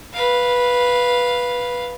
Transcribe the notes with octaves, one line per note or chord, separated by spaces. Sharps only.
B4 F5